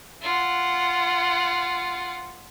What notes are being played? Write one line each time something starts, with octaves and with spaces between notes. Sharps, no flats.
F4 F#5